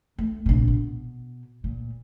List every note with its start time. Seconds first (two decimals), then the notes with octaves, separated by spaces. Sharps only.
0.18 A3
0.46 A#1 C3
0.68 B2
1.64 A#2